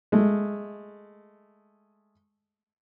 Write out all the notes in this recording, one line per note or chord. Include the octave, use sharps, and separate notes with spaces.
G#3 A3